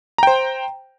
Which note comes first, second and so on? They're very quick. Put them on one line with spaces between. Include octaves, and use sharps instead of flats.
A#5 G5 C5